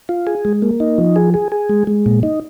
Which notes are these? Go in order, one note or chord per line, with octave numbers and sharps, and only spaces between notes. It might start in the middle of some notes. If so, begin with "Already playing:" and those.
F4
G#4
G#3
A#3
D#4
F3
G#4
G#4
G#4
G#3
G#3
A#2
D#4